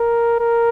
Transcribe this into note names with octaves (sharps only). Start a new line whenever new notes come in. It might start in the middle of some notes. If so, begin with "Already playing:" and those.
Already playing: A#4
A#4